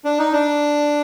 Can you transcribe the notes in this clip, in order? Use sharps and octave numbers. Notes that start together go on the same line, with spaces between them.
D4
D#4
D4